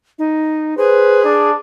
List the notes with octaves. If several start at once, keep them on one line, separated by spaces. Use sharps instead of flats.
D#4
G#4 B4 C5
D4